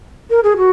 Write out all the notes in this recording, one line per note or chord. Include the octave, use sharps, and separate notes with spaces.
A#4
G#4
F#4